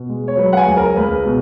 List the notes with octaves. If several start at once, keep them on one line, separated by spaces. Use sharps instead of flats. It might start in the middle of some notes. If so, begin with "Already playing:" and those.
Already playing: B2
G#3
C#5
F#3 B4
F#5
G#5
C#2
A#4
C#2 B4
B2